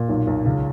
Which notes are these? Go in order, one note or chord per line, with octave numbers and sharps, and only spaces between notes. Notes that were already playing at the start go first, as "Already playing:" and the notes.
Already playing: A#2
B1
B1
C#2